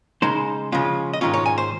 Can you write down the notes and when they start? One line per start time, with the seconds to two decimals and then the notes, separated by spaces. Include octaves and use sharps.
0.22 C#3 G#3 D#4 C5
0.72 C#3 F3 G#3 C#4 F4
1.13 D#5
1.21 G#2 D#3 G#3 C#4 F4 C#5
1.34 C#5
1.46 G#5
1.58 C5